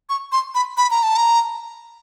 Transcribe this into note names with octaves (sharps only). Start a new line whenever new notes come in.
C#6
C6
B5
B5
A#5
A5
A#5